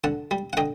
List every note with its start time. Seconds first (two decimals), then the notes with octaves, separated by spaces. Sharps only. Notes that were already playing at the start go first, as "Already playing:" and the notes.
0.04 D3 F#5 A5
0.31 G3
0.53 F#5
0.57 D3 D#5 G5